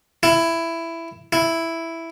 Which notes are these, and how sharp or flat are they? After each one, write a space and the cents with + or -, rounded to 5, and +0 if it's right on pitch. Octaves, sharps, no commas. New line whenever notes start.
E4 +10
E4 +0